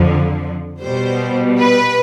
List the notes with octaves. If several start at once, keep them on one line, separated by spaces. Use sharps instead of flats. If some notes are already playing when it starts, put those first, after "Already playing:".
Already playing: F2 D3 F3
B2 G3 C5
B4